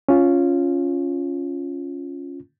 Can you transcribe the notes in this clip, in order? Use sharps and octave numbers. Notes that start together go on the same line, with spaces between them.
C#4 F4